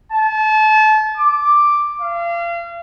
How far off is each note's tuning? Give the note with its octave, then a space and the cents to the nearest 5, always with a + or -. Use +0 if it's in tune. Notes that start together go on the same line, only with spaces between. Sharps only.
A5 -30
D6 +0
F5 -35